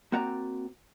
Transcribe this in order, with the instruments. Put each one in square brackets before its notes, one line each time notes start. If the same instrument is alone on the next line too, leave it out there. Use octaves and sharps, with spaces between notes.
[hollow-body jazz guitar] A#3 C4 F#4 D5 A#5